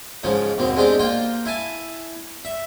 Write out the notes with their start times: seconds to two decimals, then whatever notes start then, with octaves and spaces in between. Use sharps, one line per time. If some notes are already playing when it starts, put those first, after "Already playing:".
0.24 G#2 C#3 F3
0.58 D#2 B2 C4
0.77 G#3 C4 D4 G4
0.99 A#3 F4 G5
1.46 E4 G#5 A5
2.45 E5